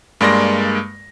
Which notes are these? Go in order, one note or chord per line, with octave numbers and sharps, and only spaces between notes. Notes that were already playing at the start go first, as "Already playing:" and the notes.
G2 G#3 A#3 D5 C6 A#6